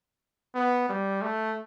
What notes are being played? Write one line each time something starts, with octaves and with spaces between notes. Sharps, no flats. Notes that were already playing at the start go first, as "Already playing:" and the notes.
B3
G3
A3